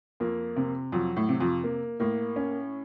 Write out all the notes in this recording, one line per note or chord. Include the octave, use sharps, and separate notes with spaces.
F2 A#3
C3
F2 F#3
A2
C3
F2
A#3
A2 A#3
C#4